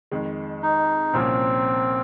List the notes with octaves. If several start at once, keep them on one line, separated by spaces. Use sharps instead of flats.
F2 D#3 G#3
D#4
C2 A#2 F3 A#3 C4 C#4